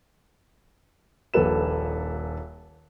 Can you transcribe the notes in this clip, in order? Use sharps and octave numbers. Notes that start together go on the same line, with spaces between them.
D#1 A#1 A#3 A4 B4 E7